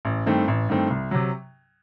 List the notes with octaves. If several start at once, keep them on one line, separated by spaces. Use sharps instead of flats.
A1
G2 D#3 A3 C4
A1
G2 D#3 A3 C4
C2
C3 F#3